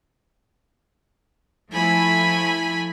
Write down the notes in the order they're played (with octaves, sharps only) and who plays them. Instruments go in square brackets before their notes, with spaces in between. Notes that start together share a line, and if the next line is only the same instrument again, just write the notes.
[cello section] F3 A3 E4 [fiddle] G#5 B5